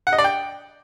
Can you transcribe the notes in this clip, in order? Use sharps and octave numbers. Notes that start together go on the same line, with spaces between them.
F#5
D#5
D5
G5